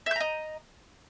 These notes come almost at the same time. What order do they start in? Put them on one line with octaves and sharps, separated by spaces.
E5 G6 A#5 D#5